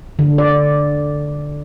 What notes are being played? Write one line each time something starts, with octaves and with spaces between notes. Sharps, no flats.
D3
D5